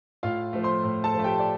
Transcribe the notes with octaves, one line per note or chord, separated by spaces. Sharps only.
A2 F4 F5
F3 A3
C5 C6
A2
A4 A5
F3 A3
G4 G5
D5